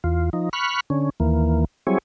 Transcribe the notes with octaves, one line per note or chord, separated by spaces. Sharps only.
E2 F4
F3 D#4
B5 C#6 F6 F#6
D3 C#4
D#2 E3 A#3
F#3 G3 C4 E4 G#4 C#5